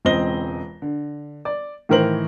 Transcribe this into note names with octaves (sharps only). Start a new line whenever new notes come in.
E1 C#2 C4 D#5 A#6 G7
D3
D5
A2 D#3 E3 A#4 C5 F#7